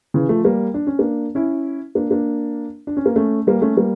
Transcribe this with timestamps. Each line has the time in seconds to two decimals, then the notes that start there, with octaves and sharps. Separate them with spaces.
0.14 C#3 E3
0.29 F3 A3
0.44 G3 A#3
0.74 D4
0.87 C#4
0.99 A#3 D4
1.35 C#4 E4
1.95 A#3 D4
2.11 A#3 D4
2.87 D4
2.97 C#4
3.06 A#3
3.16 A3 C#4
3.47 G3 A#3
3.62 A3 C#4
3.77 G3 A#3